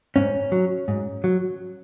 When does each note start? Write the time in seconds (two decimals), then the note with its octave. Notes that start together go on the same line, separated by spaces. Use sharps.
0.16 G#2 C#4
0.52 F#3
0.88 G#2
1.24 F#3